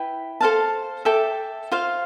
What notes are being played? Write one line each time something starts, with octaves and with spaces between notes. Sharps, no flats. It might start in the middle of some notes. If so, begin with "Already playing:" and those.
Already playing: E4 B4 G5
A4 C5 F5 A5
A4 E5 G5 D6
F4 C5 F5